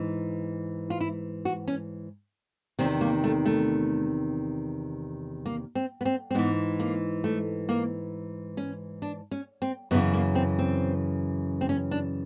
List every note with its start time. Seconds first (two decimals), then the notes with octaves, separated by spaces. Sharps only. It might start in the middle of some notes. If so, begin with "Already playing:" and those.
Already playing: G#2 E3
0.90 F4
1.00 E4
1.45 F#4
1.68 C#4
2.79 E2 C3 D#3 C4
3.01 A#3
3.24 A3
3.46 A3
5.46 A#3
5.75 C4
6.01 B3
6.05 C4
6.31 C4
6.35 G#2 E3 B3
6.80 A#3
7.24 A3
7.69 A#3
8.57 C#4
9.02 D4
9.31 C#4
9.62 C4
9.91 F#2 C#3 E3 B3
10.13 A#3
10.35 C4
10.59 C4
11.61 C4
11.69 C#4
11.91 D4